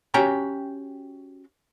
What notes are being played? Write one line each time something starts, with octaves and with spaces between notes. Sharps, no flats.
C#4 F#4 G4 G5 A#5